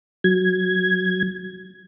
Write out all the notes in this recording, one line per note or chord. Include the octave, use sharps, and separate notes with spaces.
F#3 G#6